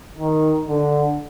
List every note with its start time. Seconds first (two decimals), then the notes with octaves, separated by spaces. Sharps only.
0.18 D#3
0.68 D3